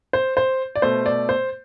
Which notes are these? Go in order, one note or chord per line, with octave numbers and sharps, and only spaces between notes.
C5
C5
D5
B2 A3 C5
D5
C5